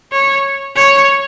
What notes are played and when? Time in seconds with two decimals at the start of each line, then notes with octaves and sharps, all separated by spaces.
0.12 C#5
0.76 C#5